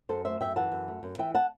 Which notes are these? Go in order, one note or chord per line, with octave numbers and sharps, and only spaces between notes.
F#2 A4 C5
A3 C5 E5
F#2 E5 G5
E3 F#5 A5
F#2
A3
F#2
E3 E5 G5
F#5 A5